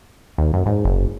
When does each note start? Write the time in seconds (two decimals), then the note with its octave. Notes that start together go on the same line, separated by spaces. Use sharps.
0.38 D#2
0.54 F#2
0.66 G#2
0.85 F#1